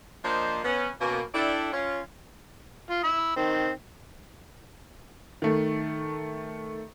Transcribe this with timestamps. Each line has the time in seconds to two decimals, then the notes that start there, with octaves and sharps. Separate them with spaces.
0.24 F3 A#3 D4 C5 D#5
0.64 B3 C#4
1.00 B2 A#3 C#4
1.34 D4 E4 A4 D5 E5 G5
1.73 C#4 F4
2.90 F4
3.04 B5 E6
3.37 D#3 C4
5.42 D#3 A3